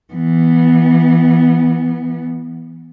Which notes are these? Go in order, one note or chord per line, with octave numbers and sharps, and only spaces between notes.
E3 B3